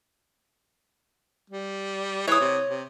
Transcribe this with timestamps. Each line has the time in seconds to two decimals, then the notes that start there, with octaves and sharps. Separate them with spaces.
1.50 G3
2.28 E3 C#5 D#6
2.40 C3
2.69 C3